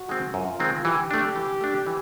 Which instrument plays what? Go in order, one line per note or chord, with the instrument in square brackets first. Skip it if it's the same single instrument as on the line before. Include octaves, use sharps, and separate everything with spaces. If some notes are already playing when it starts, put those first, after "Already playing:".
Already playing: [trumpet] F#4
[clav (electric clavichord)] D#3 G#3 C4
[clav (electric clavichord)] F#2 [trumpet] F4
[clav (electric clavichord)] D#3 G#3 C4
[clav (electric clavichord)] E3 [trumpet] G4
[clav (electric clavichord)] A3 D4
E3
A3 D4
E3